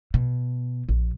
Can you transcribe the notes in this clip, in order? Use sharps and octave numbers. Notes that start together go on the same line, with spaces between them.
B2
A#1